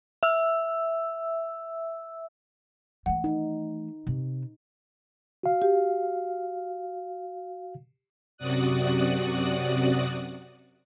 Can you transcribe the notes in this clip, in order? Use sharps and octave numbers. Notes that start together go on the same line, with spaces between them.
E5 E6
E3 A3 F#5
D#4
C3
F#4 F5
G4
F#2 C3 F#4 D5 D#6 F#6